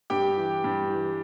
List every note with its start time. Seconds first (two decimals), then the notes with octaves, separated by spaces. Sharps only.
0.10 G2 G4 G5
0.37 E3
0.64 G2
0.90 E3